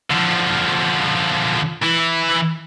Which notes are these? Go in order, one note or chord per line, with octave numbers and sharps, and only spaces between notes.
D3 F3
E3 E4